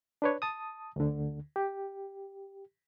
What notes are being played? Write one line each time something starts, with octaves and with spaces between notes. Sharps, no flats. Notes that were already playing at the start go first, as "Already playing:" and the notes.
D4 B4 C#5
A5 D#6
D2 D3
G4